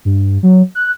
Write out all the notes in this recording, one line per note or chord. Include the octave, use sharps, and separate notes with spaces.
G2
F#3
F#6